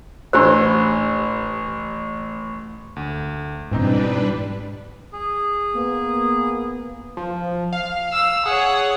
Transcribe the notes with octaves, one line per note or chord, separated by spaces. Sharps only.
A1 D4 G4 C5 E6
D2
G#2 B2 E3 G3 C4 D4 D#4 B4
G#4
A#3 B3
F3
F5
E6
G#4 C#5 F#5